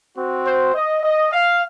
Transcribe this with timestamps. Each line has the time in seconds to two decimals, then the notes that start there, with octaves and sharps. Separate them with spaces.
0.18 C4 F#4
0.46 C5
0.75 D#5
1.03 D#5
1.32 F5